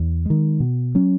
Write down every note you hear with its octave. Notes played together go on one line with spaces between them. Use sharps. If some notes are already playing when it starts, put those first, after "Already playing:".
Already playing: E2
D#3 G#3
B2
F#3 C#4